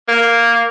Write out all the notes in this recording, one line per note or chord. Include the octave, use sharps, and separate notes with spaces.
A#3